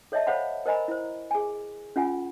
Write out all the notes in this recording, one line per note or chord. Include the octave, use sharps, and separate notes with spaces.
A4 C#5 D#5 E5 A5
A4 C5 C#5 F5 F#5 B5
A#4 C5 D#5 G#5 A#5 B5
E4 C5
G#4 G#5
C#4 F4 F#5 G#5